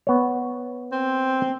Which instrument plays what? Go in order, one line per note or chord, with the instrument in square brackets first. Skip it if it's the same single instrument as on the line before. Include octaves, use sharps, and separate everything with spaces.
[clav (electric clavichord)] B3 C#5
[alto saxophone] C4